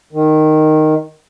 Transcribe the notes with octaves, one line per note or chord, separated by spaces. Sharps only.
D#3